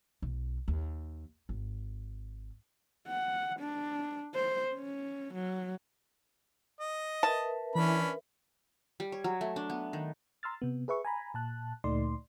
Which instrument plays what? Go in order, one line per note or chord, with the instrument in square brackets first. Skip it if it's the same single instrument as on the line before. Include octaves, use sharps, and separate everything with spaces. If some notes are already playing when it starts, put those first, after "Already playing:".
[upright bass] B1
D#2
G#1
[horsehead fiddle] F#5
D4
C5
C#4
F#3
[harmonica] D#5
[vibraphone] A#4 B4 E5 [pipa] A5
[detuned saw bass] E3 [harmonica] C#4 D4 B5
[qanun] G3
C#5
F#3
A3
D4
B3
D#3
[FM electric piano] A#5 C6 E6 F6 A6
C3 B3
G#4 B4 E5 C#6
G#5 A#5 B5
A#2 A5 F#6
D2 A#2 A3 D#4 D5 C6